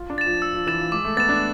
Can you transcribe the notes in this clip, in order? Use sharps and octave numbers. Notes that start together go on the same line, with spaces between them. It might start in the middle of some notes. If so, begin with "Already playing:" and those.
Already playing: F4
D4
A6 E7
F3
E6
F3
E3 A6 E7
F3
G#3 D6
A3
B3 A6 E7
D4